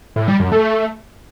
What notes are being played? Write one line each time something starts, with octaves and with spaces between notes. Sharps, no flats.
A2
G3
F#2
A3